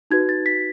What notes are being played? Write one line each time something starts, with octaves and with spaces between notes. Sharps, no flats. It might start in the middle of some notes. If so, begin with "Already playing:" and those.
D#4 F#4 B4 G#6
A6
B6